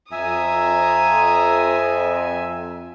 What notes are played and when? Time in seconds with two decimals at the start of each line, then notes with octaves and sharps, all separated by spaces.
0.12 F2 E5 G#5 A#5 D#6